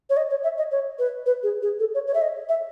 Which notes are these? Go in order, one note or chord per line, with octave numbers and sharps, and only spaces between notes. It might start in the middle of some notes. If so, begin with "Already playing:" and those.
C#5
D#5
C#5
E5
D#5
C#5
B4
B4
G#4
G#4
A4
C#5
C#5
E5
D#5
E5